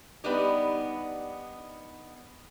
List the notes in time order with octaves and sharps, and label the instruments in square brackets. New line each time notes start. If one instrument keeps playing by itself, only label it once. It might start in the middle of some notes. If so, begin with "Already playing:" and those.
[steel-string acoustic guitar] G3 B3 D4 D#4 G4